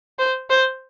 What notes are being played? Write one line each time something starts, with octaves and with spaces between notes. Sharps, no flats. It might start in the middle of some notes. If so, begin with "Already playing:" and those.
C5
C5